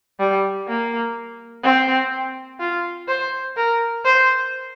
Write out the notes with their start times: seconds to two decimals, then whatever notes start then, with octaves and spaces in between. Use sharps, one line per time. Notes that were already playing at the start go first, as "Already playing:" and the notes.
0.19 G3
0.67 A#3
1.63 C4
2.60 F4
3.08 C5
3.56 A#4
4.05 C5